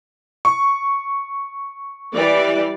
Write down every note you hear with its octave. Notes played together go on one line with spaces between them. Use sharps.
C#6
E3 G3 D5